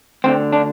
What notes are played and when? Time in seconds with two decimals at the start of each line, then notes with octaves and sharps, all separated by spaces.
0.24 D2 D3 C4
0.53 D4